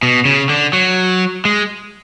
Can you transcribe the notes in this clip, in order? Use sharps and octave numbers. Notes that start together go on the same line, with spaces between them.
B2
C#3
D3
F#3
G#3